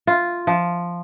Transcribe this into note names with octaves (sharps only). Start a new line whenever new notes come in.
F4
F3